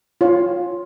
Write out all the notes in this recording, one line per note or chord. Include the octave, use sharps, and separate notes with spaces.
F4 C#5